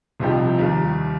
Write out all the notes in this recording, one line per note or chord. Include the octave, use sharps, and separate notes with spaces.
C2 C3 F3 D#4 G4
D#2 D#3 G3